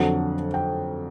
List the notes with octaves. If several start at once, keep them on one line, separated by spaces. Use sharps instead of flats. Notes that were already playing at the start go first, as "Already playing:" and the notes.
Already playing: F2 D3 F#3 F#5
G5